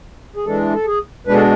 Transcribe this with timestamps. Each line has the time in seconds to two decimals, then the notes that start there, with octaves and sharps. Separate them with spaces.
0.36 G#4
0.46 E3 G#3 D4 A4
0.74 A4
0.86 G#4
1.27 B2 G#3 D4 B4
1.34 A4